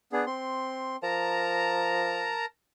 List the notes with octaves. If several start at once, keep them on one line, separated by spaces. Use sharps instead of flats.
B3 D4 G#4
C4 C6
F3 A#4 A5 A#5